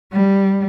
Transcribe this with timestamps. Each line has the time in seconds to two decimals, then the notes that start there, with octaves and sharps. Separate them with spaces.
0.12 G3